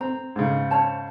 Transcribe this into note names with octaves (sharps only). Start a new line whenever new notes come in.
C4 A#5
G#2 C#3
C5 C#5 A5